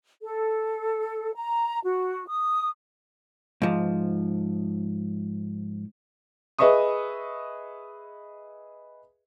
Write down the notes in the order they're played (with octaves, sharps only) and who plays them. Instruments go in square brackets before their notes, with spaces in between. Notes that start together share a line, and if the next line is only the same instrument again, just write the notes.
[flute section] A4
A#5
F#4
D#6
[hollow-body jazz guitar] G#2 F3
[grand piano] G#4 B4 D#5 E5 C#6 D#6